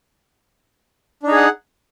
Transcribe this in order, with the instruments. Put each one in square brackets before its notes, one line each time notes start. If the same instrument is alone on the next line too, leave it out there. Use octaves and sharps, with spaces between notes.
[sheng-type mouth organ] D4
D#4
G#4
F#5